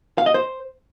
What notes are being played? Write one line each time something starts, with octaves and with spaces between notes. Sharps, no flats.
F5
D#5
C5